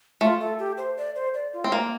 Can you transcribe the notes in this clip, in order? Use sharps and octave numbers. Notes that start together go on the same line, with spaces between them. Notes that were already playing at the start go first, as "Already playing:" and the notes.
A3 F4
A4
G4
C5
D5
C5
D5
F4
C4
A#3